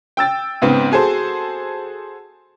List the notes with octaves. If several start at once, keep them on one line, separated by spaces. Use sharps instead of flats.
G5 E6 A6
G#2 C#3 B3 C4
F#4 G#4 A4 C5